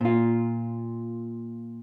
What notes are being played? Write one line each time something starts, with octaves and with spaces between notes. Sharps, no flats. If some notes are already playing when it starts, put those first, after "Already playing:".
A#2 F4